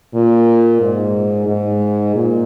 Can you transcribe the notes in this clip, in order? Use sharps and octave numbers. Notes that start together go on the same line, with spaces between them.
A#2
G#2
G#2
A#2